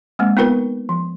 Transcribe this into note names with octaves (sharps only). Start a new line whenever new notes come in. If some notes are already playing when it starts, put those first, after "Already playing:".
G#3 A#3 C4
B3 D#4 F4 A#4 B4
F3